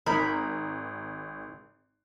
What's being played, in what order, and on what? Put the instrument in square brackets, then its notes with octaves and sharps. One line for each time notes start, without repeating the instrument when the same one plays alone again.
[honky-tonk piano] G#1 [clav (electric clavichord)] D#4 [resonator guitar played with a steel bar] A#4 [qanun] B5